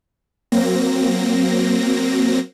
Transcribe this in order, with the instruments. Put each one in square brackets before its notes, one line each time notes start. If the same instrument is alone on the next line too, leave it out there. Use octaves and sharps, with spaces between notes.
[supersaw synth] F#3 A#3 C4 A#6